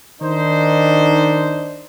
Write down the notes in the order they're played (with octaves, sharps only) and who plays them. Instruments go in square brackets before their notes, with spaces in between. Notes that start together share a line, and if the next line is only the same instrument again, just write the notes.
[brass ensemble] D#3 D4 D#4 C5